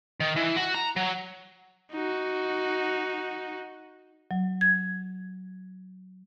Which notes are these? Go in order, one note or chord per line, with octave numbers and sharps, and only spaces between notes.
D#3
E3
F#4
A#5
F#3
D#4 F#4
F#3
G#6